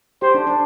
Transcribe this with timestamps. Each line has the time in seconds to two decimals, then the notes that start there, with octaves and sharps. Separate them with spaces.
0.22 G4 C5
0.35 D4
0.47 D4